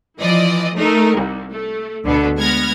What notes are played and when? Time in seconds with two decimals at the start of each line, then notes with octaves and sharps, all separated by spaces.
0.19 E3 F3 D5 D#5
0.76 A3 D#4 A#4
1.17 C2
1.51 A3
2.04 D2 B2 D3 A3 B3 A4
2.37 G#3 B3 F6 G#6 A#6